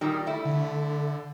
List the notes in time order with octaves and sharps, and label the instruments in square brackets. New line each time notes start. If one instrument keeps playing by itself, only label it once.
[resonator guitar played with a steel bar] A#2 D#3 G3
A3 E4
[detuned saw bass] D3